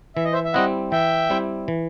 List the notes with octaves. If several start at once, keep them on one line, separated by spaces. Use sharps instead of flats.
E3 E5
D#5
C5 E5
E5
G3 C4 E4 D#5 F#5
E3 E5 G5
G3 C4 E4
E3